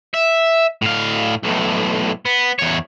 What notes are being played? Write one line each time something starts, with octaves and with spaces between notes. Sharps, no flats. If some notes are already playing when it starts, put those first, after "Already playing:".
E5
A2 F5
B1 A2
B3
E2 C#5